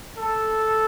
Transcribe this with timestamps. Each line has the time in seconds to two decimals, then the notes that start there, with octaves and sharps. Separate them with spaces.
0.18 A4